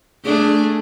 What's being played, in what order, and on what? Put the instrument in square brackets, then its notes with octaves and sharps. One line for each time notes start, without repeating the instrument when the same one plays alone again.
[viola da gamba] A3 D4 G#4